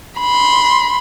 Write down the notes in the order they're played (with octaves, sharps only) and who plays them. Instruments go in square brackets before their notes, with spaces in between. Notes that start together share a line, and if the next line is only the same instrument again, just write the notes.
[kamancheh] B5 C6